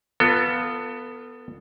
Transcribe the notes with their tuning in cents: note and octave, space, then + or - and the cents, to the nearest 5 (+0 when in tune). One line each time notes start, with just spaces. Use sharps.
B3 +0 F4 +0 A4 +25